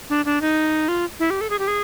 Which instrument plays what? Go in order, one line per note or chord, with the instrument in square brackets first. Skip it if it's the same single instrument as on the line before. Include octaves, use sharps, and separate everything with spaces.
[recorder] D4
D4
D#4
F4
E4
G4
A4
G#4
G4
G#4